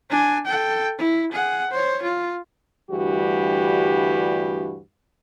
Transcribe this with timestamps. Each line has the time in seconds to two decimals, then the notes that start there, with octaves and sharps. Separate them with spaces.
0.10 D4 G#5
0.46 A4 G5
0.99 E4
1.32 G#4 F#5
1.71 C5 C#5
2.03 F4
2.90 D2 G2 E3 G3 F#4 G4